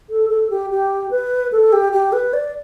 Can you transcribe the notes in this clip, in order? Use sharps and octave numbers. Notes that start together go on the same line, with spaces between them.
A4
A4
G4
G4
B4
A4
G4
G4
B4
D5